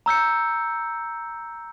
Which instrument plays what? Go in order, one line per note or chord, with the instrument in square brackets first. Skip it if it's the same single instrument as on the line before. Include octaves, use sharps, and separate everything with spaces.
[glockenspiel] A#5 E6 G6 C#7